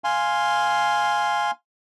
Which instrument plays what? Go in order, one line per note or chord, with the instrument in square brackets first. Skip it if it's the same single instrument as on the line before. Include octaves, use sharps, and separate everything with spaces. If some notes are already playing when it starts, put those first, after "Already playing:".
[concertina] F5 G#5 C6